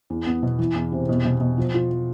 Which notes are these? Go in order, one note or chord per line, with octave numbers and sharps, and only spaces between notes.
E2
B3
B2
E3
E2
C3
B2
B2
B2
F3
F4
F3